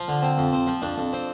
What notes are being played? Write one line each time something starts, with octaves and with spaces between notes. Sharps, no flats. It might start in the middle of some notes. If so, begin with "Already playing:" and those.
Already playing: F3 F4
D3
C4
F2
C4
F3
F2 D4
F2
C4